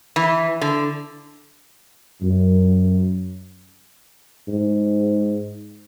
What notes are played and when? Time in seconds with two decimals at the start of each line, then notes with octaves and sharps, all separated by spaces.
0.16 E3
0.61 D3
2.22 F#2
4.49 G#2